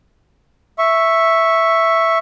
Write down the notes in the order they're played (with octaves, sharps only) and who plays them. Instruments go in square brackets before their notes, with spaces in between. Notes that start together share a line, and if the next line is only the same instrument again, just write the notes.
[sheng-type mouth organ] E5 C#6